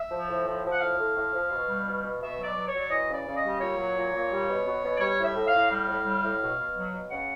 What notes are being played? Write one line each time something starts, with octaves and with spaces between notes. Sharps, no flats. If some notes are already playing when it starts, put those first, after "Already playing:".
Already playing: E5
F3
A2
F3
F3
F#5
A2 F5
A2
A2
F3
B2
G3
B2
B2
B2 E5
F#3
D5
F#3
C#5
F#3
D5
E3 D#5
C#3
D5
C#3
D#5
G3
A#2 C#5
F#3
A#2
A#2
G3
B2
B2
B2
D5
G3 C#5
A2
E5
A2
F5
A2
G3 F5
A2
G3
A2
B2
B2
F#3
B2
C#3 F#5